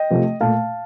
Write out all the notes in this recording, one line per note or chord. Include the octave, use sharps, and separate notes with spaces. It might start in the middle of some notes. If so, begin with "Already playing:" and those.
Already playing: D#5 G5
C3 F3 A3
A#2 A3 F5 A5